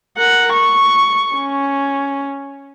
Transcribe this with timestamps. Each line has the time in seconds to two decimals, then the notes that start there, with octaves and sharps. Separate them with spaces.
0.17 A#4 F#5
0.53 C#6
1.35 C#4